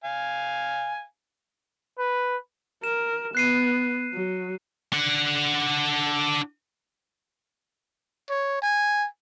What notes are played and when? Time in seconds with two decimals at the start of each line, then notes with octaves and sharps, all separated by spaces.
0.04 F5 G#5
1.98 B4
2.84 A#4 E7
3.35 B3 F#6 C7 D#7
4.14 F#3
4.93 D4 F#5
8.30 C#5
8.62 G#5